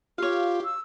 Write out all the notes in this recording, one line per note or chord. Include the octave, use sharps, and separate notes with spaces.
F4 G4 C#5 F5
E6